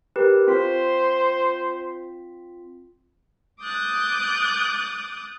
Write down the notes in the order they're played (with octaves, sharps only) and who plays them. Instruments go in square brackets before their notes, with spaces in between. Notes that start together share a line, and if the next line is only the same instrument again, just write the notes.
[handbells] G4 A#4 B4
[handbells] C4 F4 B6 [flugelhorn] C5
[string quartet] D6 D#6 F#6 G6 A6